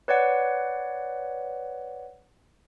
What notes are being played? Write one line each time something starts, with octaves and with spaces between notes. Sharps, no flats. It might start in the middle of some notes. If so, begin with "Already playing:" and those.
B4 C#5 D5 F#5